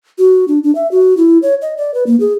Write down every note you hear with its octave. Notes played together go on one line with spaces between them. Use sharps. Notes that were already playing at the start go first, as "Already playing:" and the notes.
F#4
D4
D4
E5
F#4
E4
C#5
D#5
D5
B4
A#3
G#4